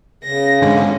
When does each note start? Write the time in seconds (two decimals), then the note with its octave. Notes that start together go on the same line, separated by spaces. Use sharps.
0.24 C#3 A#6
0.62 G#2 D3 C#4